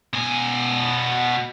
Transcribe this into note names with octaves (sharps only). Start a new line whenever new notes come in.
B2 G#5